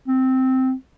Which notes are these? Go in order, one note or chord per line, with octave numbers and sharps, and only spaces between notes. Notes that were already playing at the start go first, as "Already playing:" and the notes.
C4